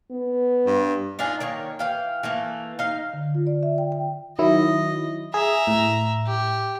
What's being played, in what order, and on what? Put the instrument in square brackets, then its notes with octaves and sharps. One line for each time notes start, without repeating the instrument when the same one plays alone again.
[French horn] B3
[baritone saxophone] G2
[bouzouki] D4 D#4 F4 G#4
D#3 A#3 C#5
E3 F5 G5
E3 A3 A#3
D#4 F5
[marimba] D3
F4
D5
E5
G5
G5
[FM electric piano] D#3 F#3 E4 [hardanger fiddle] D#5
[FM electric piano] G#4 [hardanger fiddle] E5 A#5
[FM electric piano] A2
[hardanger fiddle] G4